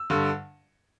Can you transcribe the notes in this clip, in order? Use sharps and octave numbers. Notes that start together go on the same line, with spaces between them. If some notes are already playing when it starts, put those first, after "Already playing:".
Already playing: E6
G2 D3